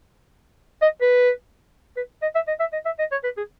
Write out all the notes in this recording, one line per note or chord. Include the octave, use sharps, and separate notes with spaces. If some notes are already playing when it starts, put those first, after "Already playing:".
D#5
B4
B4
D#5
E5
D#5
E5
D#5
E5
D#5
C#5
B4
G#4